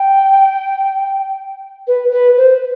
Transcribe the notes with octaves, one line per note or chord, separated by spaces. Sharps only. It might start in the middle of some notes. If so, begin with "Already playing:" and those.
Already playing: G5
B4
B4
C5